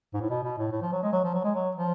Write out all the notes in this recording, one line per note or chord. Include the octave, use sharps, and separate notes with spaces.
G#2
A2
B2
B2
A2
A2
F3
F#3
G#3
F#3
F3
F#3
G#3
F#3
F3